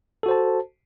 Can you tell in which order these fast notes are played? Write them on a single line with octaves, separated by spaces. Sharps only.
A4 F#4 C5 A5